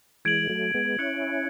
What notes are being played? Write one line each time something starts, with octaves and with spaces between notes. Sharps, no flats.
E3 G#3 G#6 D7 F#7
F#3 A3
G#3 B3
C#4 E4 F#6 C#7 F#7